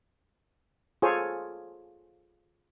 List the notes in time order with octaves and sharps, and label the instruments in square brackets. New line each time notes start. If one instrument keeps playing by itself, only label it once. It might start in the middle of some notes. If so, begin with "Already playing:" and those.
[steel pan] F4 G#4 A4 C5 C#5 G#5